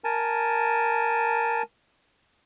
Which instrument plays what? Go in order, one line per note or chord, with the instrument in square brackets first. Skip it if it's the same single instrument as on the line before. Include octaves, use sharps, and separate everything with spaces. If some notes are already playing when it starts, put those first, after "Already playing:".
[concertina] A#4 G#5 A5